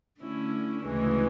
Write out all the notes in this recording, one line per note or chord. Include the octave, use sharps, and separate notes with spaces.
D3 A3 C#4 E4
D2 C#3 E3 G#3